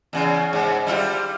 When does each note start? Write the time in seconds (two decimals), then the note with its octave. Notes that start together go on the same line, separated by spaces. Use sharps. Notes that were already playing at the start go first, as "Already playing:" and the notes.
0.13 E2 C#3
0.53 G#2
0.87 G3 E4 F4